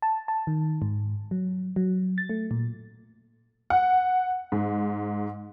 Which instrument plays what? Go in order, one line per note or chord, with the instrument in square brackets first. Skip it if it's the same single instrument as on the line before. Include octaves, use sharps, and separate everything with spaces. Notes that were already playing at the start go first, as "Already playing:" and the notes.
[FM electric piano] A5
A5
D#3
G#2
F#3
F#3
A6
A3
A#2
[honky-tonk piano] F#5
G#2